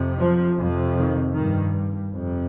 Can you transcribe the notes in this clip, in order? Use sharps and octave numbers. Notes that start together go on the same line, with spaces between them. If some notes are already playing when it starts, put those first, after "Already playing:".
Already playing: F2 C3
F3
F2 C3
D#3
G2 D#3
F2 C3